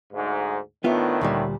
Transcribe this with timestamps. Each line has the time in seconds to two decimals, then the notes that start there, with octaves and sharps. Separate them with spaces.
0.13 D2 G#2
0.84 A2 D#3 B3 D4 F4 E5
1.21 D2 A#2 G3